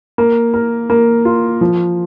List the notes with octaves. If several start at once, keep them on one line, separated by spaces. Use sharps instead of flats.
A#3
A#4
A#3
F4
F3